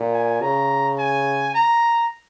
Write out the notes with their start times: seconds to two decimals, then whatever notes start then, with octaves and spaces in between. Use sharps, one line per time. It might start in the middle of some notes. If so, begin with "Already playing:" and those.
Already playing: A#2
0.13 G#5
0.42 C#3 A#5
0.98 G#5
1.54 A#5